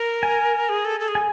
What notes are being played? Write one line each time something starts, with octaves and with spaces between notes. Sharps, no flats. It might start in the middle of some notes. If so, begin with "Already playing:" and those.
Already playing: A#4
G#5
G#4
A4
A4
G#4
G#5